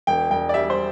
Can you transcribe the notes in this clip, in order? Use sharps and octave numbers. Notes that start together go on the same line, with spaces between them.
E1 G5
E1 G5
D5
G3 E5
C5